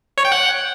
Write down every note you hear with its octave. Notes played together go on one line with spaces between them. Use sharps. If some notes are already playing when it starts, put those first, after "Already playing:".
C#5
G5
F#5